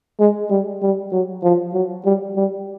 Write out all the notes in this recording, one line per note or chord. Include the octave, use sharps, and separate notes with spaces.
G#3
G3
G3
F#3
F3
F#3
G3
G3